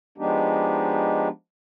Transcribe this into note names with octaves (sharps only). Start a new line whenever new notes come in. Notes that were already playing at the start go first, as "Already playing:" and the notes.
F3 G#3 B3 D4 D#4 G4